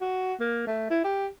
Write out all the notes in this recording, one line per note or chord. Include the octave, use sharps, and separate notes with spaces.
F#4
A#3
A3
E4
G4